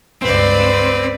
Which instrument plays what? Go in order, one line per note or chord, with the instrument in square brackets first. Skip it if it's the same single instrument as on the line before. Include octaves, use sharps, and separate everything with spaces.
[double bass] C#2 G2 [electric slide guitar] C4 [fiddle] B4 D5